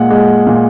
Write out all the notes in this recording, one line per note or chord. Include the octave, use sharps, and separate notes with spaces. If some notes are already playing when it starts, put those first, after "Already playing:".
Already playing: A#2 G#3 F#5
G#3
A#2